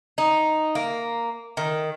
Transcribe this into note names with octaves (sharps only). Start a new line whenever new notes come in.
D#4
A#3
D#3